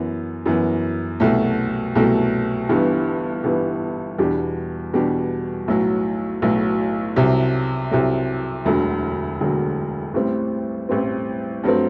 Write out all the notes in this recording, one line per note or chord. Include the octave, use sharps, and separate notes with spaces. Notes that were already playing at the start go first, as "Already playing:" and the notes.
Already playing: F#2 E3 B3
F#2 E3 B3
C2 B2 F#3 A3
C2 B2 F#3 A3
G1 G2 E3 G3 B3
G1 G2 E3 G3 B3
E2 B2 G3 D4 G4
E2 B2 G3 D4 G4
B1 A2 F#3
B1 A2 F#3
C2 C3 F#3
C2 C3 F#3
E1 D2 D3 F#3
E1 D2 D3 F#3
A1 A2 G3 C4
A1 A2 G3 C4
G2 F#3 A3 C4